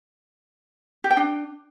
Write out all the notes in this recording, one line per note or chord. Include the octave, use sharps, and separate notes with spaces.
G4
G5
D4